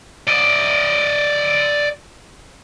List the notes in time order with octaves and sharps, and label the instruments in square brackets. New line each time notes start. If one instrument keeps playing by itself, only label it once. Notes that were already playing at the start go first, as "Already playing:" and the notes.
[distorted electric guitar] D5 D#5